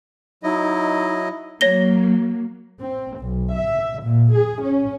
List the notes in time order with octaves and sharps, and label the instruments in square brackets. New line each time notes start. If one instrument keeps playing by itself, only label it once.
[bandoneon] F#3 E4 D#5 [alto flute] D#4
[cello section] F#3 A#3 [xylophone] C#5 A#6 G7
[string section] C4
B1
E5
A#2
G#4
C#4